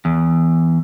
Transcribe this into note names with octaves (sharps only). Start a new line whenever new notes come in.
E2